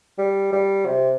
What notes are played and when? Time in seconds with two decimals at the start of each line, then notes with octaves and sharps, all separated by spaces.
0.18 G3
0.52 G3
0.86 C3